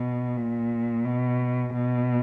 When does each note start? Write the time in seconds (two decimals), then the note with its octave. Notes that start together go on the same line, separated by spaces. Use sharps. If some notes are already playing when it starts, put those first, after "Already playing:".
Already playing: B2
0.36 A#2
1.05 B2
1.73 B2